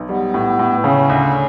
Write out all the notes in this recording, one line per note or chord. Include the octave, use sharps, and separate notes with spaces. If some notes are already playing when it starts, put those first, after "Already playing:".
Already playing: B1
G3 B3
A2
A2
C#3 C#4
D2